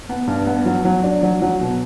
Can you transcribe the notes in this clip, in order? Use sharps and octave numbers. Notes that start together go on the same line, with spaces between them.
B3
G2
B3
F#3
F#3
D4
F#3
F#3
B2